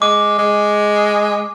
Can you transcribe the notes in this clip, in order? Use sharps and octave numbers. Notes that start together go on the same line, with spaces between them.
G#3 D6
G#3